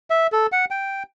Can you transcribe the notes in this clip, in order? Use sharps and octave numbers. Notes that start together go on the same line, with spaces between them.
E5
A4
F#5
G5